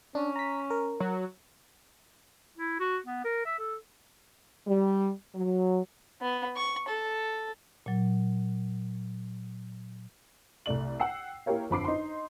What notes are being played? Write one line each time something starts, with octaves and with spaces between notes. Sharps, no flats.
C#4 D4
A#5 B6
A#4
F#3
E4
F#4
B3
A#4
E5
A4
G3
F#3
B3
C#6
A4
A#2 F#3
C2 A3 D5 F#7
F#5 G5 E6 C7
A#3 E4 G4 A#4 C#5 F5
G1 F2 B5 D6 C7
D#4 C6